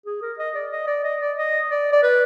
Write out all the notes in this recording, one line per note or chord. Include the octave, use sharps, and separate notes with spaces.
G#4
A#4
D#5
D5
D#5
D5
D#5
D5
D#5
D5
D5
B4